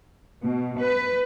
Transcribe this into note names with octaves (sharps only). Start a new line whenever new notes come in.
B2
B4